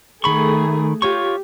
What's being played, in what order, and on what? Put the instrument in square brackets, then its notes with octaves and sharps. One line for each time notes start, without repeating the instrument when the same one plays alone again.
[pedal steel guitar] D#3 B5 C#6 [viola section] A3 G#4
[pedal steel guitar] F4 C#5 C#6 [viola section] G4